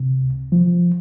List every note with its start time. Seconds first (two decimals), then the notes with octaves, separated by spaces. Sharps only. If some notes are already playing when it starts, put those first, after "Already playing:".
Already playing: C3
0.21 C#2
0.52 F3